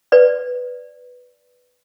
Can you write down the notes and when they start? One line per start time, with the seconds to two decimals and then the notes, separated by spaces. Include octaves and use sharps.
0.12 B4 D5